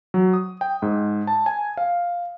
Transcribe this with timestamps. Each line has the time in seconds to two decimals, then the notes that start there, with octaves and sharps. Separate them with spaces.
0.14 F#3
0.33 D#6
0.61 G5
0.82 G#2
1.27 A5
1.46 G#5
1.77 F5